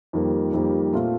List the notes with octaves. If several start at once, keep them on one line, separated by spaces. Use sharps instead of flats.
F2 D#3 G3 A#3
F2 D#3 G3 A#3
A#2 A3 C4 F4